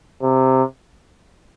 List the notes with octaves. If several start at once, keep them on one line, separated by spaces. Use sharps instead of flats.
C3